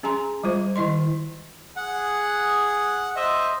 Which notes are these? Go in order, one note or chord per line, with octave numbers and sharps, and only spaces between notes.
C#4 G#4 G#5 A#5 C6
G3 G#3 F4 C5
D#3 E4 D#5 C6
G#4 F#5
C5 D#5 E5